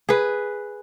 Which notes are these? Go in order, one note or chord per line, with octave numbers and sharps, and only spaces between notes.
G#4 B4